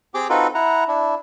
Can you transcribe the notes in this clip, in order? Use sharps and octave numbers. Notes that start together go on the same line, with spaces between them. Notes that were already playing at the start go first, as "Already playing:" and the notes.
C4 G4 G#4 G5 D6
C4 D#4 F4 F#4 A4 B4
E4 F#5 A#5
D4 E4